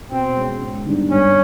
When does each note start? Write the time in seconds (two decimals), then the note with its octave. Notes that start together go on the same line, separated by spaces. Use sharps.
0.11 B2 C4
0.36 G#3 C#4
0.61 G#2
0.86 D#3 G3 B3 D4
1.11 G2 C#4